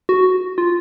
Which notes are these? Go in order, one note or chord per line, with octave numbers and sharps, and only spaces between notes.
F#4
F4